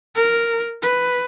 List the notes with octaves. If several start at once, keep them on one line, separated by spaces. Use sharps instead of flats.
A#4
B4